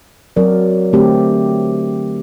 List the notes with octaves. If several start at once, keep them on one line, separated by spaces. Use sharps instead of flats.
F#3 C4 F#4 A#4 D5
D3 A3 C4 G4